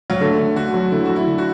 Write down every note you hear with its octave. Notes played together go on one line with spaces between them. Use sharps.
F#3
D3 A3
D3
D3 F#4
F#3
D3 E4
F#3 F#4
E4
D3
F#4